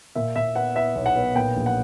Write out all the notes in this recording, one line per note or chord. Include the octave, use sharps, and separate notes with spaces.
A#2 E5
A#2 E5
B3 F#5
B3 E5
B1
F#5
B3
A#2 G5
A#1
F#5